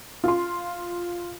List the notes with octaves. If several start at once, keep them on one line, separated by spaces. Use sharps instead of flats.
F4 C6